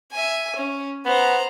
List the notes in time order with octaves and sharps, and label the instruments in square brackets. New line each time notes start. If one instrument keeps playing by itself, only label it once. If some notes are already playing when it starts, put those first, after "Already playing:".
[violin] E5 G#5
C#4
[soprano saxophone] B3 [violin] C5 A#5